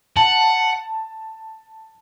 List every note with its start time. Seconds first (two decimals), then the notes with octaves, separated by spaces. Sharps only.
0.16 F#5 A5